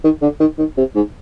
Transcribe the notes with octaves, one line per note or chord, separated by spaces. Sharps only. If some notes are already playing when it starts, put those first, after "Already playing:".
D#3
D3
D#3
D#3
C3
G#2